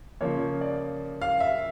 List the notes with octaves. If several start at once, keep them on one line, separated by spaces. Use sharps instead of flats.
C#3 F3 A#3 C#5
D5
F5
E5